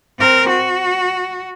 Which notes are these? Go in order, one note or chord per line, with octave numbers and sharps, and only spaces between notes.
C4 A#4
F#4